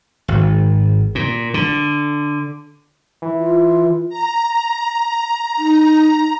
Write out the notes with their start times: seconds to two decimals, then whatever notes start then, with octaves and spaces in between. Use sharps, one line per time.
0.28 G#1
1.15 A#2
1.54 D3
3.22 E3
3.39 F4
4.09 A#5
5.58 D#4